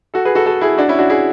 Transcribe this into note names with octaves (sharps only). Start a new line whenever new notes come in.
F#4 A4
G#4 B4
F#4 A4
F#4 A4
E4 G#4
D4 F#4
C#4 E4
D4 F#4
E4 G#4